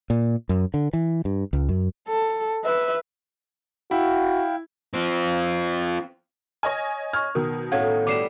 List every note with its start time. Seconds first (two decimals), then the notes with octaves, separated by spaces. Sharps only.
0.10 A#2
0.49 F#2
0.74 D3
0.93 E3
1.25 G2
1.53 C#2
1.69 F#2
2.09 A4
2.64 B4 E5
3.91 E4 F#4 F5 G5
4.94 C4 F4
6.63 C#5 D#5 G#5 F6 A#6
7.13 C#6 F6 G#6
7.35 B2 D#3 A#4
7.72 A2 C#4 F5 F#5 G#6
8.07 G3 B3 D6 C7 E7